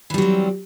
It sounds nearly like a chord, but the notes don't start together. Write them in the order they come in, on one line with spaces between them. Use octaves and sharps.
E3 G3 F#3 C4